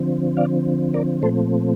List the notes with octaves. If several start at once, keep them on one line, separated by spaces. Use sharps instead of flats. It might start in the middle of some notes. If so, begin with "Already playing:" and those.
Already playing: D3 F3 C4
D5 F5
A#4 D5
A#2 F3 A3 C4 A4 C5